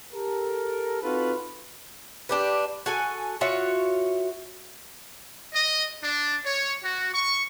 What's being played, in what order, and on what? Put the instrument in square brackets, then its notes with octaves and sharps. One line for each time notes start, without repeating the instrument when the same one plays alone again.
[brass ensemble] G4 A4 A#4
C4 D#4 F4 F#4 A4 B4
[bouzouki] D4 G4 B4
F#4 A4 G#5
F4 F#4 C#5 E5
[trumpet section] D#5
D4
C#5
F#4
C#6